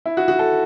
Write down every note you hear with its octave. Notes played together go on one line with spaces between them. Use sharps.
E4
F#4
F#4
A4